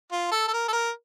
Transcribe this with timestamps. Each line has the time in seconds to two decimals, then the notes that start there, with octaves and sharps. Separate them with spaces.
0.12 F4
0.31 A4
0.48 A4
0.53 A#4
0.68 A4
0.73 A#4